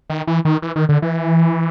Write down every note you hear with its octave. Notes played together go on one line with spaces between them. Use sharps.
D#3
E3
D#3
E3
D#3
D3
E3